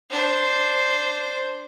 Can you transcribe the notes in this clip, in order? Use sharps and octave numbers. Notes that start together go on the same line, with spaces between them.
D4 C5